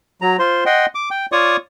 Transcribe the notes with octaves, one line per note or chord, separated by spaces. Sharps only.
F#3 A#5
F4 C5 C6
D#5 F#5 G5 C6
D6
G5
F4 C#5 D5 C#6 D#6